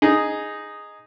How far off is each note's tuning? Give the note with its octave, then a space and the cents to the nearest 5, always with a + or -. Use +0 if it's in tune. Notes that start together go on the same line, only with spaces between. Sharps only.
D#4 +0 G#4 +0